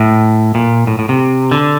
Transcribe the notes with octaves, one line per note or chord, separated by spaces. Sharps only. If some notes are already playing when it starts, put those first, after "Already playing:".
Already playing: A2
A#2
A2
A2
C3
D3